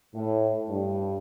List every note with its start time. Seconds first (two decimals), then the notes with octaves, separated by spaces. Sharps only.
0.14 A2
0.69 G2